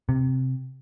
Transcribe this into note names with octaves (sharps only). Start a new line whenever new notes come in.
C3